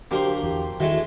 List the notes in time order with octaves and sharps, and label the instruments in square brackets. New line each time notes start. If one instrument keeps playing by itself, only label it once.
[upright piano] D3 F#3 G4 [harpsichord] A#3 A#4 C5
[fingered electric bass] E2
[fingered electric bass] D#3 [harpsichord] E3 G#3 A3 [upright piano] F#4